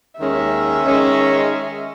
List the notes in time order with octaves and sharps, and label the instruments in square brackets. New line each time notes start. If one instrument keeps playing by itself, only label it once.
[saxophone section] D#2 D#3 G#3 C#4 [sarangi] E5
[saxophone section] D#3 G#3 C#4